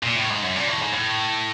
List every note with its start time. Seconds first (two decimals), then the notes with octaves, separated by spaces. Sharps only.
0.03 A#2
0.16 A2
0.30 G#2
0.43 F#2
0.56 A#2
0.68 A2
0.81 G#2
0.92 A2